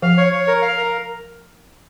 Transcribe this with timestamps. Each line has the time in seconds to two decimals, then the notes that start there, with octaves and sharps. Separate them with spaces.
0.02 F3 F5
0.18 C#5
0.32 C#5
0.47 A#4
0.62 F5
0.77 A#4